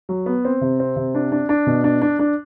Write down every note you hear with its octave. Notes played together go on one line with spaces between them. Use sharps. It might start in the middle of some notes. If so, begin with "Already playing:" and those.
F#3
B3
C4
C3
C4
C3
D4
D4
D4
B2
D4
D4
D4